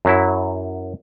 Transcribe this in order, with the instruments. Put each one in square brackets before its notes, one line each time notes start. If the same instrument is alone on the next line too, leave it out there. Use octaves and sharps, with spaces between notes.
[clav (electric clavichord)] F#2 F#3 E4